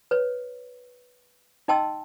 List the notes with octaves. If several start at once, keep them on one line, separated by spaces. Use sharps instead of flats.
B4 C#5
D#4 D#5 G5 A5 C6 E6